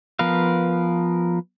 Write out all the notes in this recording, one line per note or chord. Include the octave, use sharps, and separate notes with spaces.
F3 B3 A#4 B4 F5